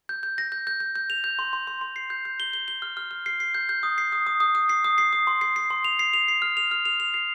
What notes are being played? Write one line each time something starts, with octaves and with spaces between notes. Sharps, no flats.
G6
G6
A#6
G6
G6
G6
G6
F7
G6
C6
C6
C6
C6
C7
G6
G6
G7
G7
G7
F6
F6
F6
C7
C7
G6
G6
D#6
C7
D#6
D#6
D#6
D#6
C7
D#6
C7
D#6
C6
C7
C7
C6
F7
C7
F7
C7
F6
F7
F6
F7
F7
C7